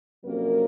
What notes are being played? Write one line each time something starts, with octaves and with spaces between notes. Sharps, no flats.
F2 C3 F#3 A#3 C#4 A#4